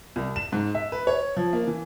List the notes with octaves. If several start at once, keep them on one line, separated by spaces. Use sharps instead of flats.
C2
E7
G#2
E5
B4
C#5
F3
A#3
E3